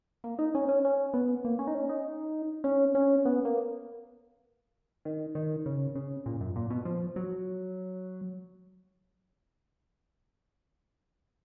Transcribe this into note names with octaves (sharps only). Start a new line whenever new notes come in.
A#3
D#4
C#4
C#4
C#4
B3
A#3
C#4
D#4
C#4
D#4
C#4
C#4
B3
A#3
D#3
D#3
C#3
C#3
A#2
F#2
A#2
B2
F3
F#3